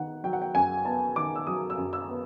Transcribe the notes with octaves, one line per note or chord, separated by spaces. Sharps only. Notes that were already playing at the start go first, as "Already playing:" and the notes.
Already playing: D#3 B3 F#5
F#3 G5
F#5
G5
F#2 G#5
B3 A5
D#3 D6
E6
F#3 D#6
E6
F#2
E6
B3